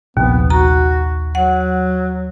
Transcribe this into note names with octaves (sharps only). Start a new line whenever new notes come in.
A#1 D#2 C3 B3
F#4 A#5
F#3 F#5